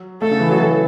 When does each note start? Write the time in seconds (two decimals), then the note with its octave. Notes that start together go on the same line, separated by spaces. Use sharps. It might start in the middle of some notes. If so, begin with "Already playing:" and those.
Already playing: F#3
0.22 A3 A4
0.31 C#3
0.40 E3
0.50 F#3
0.60 E3